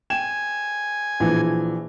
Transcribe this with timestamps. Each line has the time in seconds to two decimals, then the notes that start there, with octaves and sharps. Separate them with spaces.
0.10 G5 G#5 E7
1.20 A#1 E3 F3